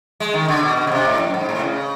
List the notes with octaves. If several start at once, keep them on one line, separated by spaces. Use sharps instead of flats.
G#3
D#3
D3
B2
B2
C#3
C3
A2
F#2
G#2
A2
C3
C#3